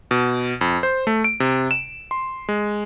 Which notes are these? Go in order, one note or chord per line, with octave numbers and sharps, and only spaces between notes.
B2
F2
C5
A3
D7
C3
E7
C6
G#3